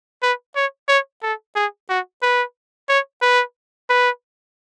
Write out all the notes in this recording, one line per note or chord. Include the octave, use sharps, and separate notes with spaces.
B4
C#5
C#5
A4
G#4
F#4
B4
C#5
B4
B4